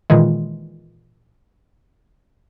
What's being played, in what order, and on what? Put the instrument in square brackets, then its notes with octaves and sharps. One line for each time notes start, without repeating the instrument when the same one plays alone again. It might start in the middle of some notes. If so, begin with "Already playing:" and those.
[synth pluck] A#2 D#3 E3 G#3